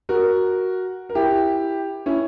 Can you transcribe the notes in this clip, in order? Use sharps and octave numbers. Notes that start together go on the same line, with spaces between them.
F#4 A#4
A#4
E4 G4
C#4 E4